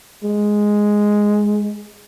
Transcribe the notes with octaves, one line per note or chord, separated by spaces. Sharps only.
G#3